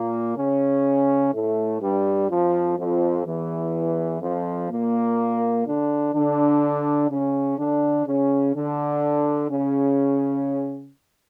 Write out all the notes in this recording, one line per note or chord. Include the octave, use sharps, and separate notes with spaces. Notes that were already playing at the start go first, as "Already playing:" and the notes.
Already playing: A#2 A#3
C#3 C#4
A2 A3
G2 G3
F2 F3
F2 F3
E2 E3
F2 F3
A#2 A#3
D3 D4
D3 D4
C#3 C#4
D3 D4
C#3 C#4
D3 D4
C#3 C#4